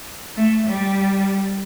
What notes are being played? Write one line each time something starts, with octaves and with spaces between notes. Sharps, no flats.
A3
G3